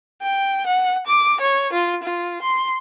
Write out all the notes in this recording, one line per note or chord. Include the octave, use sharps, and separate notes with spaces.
G5
F#5
D6
C#5
F4
F4
C6